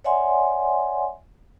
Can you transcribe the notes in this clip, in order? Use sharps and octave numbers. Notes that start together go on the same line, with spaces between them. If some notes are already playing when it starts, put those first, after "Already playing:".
C#5 D5 E5 F#5 G#5 C6